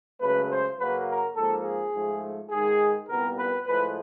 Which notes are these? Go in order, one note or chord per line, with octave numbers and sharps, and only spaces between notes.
C#2 C#3 F#3 A3 B4
C5
F#2 C#3 F#3 A#3 B4
A#4
G#2 F3 A#3 A4
G#4
G#2 F3 A3
G#2 D#3 G#3 G#4
C2 A#2 G3 B3 A#4
B4
A2 F3 G#3 B4